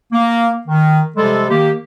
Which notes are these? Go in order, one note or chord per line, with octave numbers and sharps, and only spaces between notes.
A#3
D#3
C3 F3 G3 G#3 A4
D#3 A#3 G4